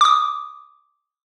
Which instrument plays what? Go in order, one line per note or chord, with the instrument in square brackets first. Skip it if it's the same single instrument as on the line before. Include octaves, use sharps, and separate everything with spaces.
[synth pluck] D6 D#6